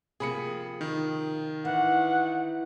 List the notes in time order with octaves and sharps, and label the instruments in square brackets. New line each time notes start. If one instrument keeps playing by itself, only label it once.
[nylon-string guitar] C3 F3 A#3 [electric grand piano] G#4 B5 C#7
[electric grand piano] D#3
[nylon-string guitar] E3 [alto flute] F#5